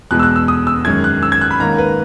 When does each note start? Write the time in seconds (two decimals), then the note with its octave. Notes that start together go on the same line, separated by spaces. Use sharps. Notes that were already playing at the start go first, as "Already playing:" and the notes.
0.11 E2 B2 G#3 F#6
0.19 E6
0.23 F#6
0.36 E6
0.48 D#6
0.67 E6
0.85 F#2 D#3 G#3 C#4 G#6
1.04 F#6
1.23 E6
1.32 G#6
1.41 F#6
1.51 B5
1.60 G#2 D#3 A#3 C#4 A#5
1.78 B4